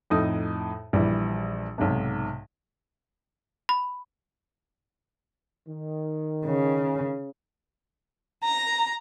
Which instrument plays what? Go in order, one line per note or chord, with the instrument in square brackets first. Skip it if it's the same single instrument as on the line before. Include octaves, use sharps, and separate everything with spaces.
[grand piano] F2 A2 D#4 D#6
A#1 E3 G3
B1 G#2 C3
[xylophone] B5
[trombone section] D#3
[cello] C#3
[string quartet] A#5